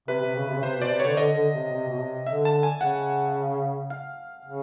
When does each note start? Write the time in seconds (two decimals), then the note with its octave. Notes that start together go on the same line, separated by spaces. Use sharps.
0.08 C3 B4
0.22 C3
0.36 C#3
0.49 C3
0.56 C#3
0.62 C3 C5
0.77 B2
0.82 D5
0.90 C3
1.00 C#5
1.04 D3
1.17 D3 D#5
1.35 D3
1.54 C3
1.72 C3
1.89 B2
2.00 C3
2.27 D3 E5
2.45 A5
2.63 G#5
2.81 C#3 F#5
3.90 F5
4.45 C#3